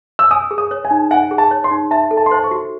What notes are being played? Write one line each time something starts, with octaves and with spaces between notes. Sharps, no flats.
E6
G#5 D#6
G#4
D#6
C#5
G#5
D#4
F#5 G#5
G#4
A5
C#5
C6
D#4
E5 A5
A4
A5
C6
C5 A5
C#6
F#4